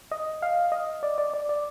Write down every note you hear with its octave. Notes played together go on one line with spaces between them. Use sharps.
D#5
F5
D#5
D5
D5
D5
D5